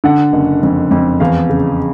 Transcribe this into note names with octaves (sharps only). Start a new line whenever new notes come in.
D3 F#5
F#1
F2
F2
E2 F5
C#3